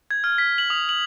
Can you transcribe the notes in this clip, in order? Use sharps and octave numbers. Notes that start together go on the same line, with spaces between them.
G#6
F6
B6
F#7
D#6
F#7